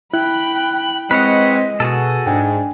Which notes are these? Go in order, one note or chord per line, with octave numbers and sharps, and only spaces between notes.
E4 G5 B5 F#6
G#3 C4 B4 C#5 D#5 F#5
B2 F#4 G#4 A4
G#2 D4 G5 G#5